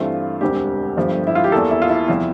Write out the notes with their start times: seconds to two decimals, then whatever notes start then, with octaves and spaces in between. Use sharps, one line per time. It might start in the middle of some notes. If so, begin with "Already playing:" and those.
Already playing: G2 E3 A3 C4 F4
0.41 E1 D2 D3 G3 C4 G4
0.97 G1 G2 F3 A3
1.27 E4
1.35 F4
1.44 G4
1.52 E2 E3 A#3 A4
1.71 E4
1.82 F4
1.89 E4
2.08 E2 C3 F3 C4